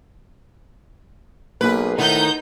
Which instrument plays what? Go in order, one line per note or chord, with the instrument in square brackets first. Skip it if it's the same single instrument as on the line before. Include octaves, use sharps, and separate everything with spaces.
[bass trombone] B1 [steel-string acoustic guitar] A#3 G#4 [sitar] B4
[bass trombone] A2 [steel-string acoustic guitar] D#3 [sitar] B3 [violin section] D#4 G6